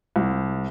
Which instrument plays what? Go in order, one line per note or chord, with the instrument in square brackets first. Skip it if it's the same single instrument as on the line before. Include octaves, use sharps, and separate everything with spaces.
[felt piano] C2